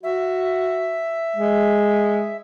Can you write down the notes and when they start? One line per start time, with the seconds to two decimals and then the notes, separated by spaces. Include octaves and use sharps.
0.03 F#4 E5
1.36 G#3